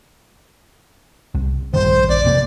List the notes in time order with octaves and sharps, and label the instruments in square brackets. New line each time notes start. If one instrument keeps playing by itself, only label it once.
[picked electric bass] C2
[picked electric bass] A#1 G2 D#3 [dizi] C5
[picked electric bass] A#1 [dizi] D5
[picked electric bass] F2 C3 A#3